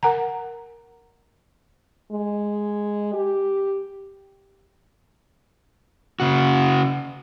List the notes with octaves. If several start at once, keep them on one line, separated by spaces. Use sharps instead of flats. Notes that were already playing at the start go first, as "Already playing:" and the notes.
A#4 F#5 G#5 A#5
G#3
G4
C#3 F#4